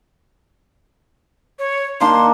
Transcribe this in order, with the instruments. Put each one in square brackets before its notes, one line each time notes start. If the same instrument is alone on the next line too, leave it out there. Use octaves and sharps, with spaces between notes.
[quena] C#5
[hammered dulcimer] D#3 A#3 D4 [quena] C6